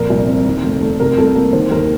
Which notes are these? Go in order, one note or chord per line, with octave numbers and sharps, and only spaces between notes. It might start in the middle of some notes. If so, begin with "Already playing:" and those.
Already playing: F2 A#2 A#4
C2
C4
D#2
F1
A3
C3 A#4
C2 A4
A#3 A#4
D#3 C5
D#2 A#4